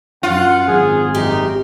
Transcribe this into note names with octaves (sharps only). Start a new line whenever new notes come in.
F#2 F4 F#5
G#1 G#4
F#2 D#4 G4 D5